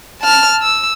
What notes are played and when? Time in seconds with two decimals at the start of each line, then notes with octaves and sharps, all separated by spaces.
0.21 A5 F6
0.63 E6